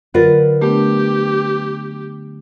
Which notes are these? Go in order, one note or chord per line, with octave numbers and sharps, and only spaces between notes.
D3 F#3 F4 A#4 B4 A6
A3 B3 D4 G4